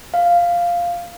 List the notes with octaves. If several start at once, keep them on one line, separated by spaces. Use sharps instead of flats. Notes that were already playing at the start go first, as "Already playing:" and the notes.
F5